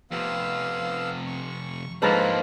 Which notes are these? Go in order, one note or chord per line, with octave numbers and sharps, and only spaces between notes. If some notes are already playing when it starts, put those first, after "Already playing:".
F2 C3 B3 F5 E6
C#6
G#2 F3 A#3 D4 A4 B4 A5 A#5